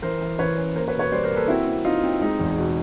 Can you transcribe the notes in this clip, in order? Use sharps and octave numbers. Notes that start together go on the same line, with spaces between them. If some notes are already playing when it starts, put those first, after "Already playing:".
E3 A#4 C5
E3
E3 B4 C#5
C#4
A#3 A#4 C5
B4 C#5
B2
B4 C#5
G3 C5 D5
A#4 C5
A#3
A4 B4
C4 E4 F#4
C4
C4 D#4 F4
C4
G#3 D#4
E2
B2